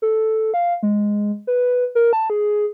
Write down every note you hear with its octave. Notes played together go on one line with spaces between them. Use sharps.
A4
F5
G#3
B4
A#4
A5
G#4